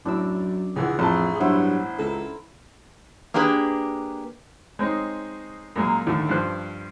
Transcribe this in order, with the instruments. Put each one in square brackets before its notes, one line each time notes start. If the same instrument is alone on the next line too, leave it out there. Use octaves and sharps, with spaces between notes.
[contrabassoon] F#2 [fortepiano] A2 [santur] D4 E6
[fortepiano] C#2 E3 F#5 [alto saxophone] G#4
[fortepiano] A1 A5 [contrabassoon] F2 [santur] A3
[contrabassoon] G2 [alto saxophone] F#3 [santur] B3 E4 C5
[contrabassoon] C#2 [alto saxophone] A4 [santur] A#4
[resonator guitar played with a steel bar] A#3 D4 G4 G#4 B4
[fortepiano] G#3 C4 C#4 D#4
F#2 A#2 G#3 A#3
D#2 A2 D3 E3 A3
G2 F3 C5 F#6